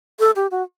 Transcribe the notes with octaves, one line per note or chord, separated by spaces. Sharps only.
A4
G4
F#4